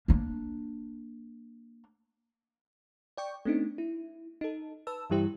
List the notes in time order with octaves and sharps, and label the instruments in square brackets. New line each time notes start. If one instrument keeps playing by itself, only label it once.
[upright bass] A#3 D4
[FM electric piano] D5 G5 C#6
A3 B3 C4 D4 D#4
E4
D#4 A4
B4 A5 E6
G2 E3 G3 E4 G4 C5